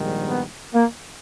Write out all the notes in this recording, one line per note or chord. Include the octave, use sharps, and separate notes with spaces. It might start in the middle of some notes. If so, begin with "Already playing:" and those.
Already playing: A#1 G#2 D#3 G3
B3
A#3